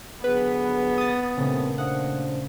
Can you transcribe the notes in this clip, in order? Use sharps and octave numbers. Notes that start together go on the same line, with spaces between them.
D3 F#3 B3 G#4 B4
D#6 A6
E2 G2 A#2 C#3 A3 C4
D#2 D4 C5 F5 F#5 D#6